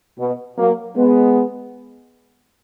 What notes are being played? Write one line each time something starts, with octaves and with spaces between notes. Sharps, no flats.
B2
F#3 A#3
G#3 B3